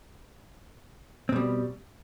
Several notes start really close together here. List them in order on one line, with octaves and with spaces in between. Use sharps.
C4 B2 G3